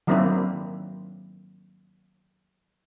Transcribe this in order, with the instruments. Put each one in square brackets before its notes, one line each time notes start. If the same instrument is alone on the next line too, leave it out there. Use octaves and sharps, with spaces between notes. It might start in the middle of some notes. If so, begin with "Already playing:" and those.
[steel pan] D#3 F#3 A#3 C4 D4 E4